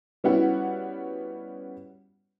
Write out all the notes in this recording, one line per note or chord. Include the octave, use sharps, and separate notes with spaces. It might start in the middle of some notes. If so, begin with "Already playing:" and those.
G3 B3 C#4 E4 F#4 F#5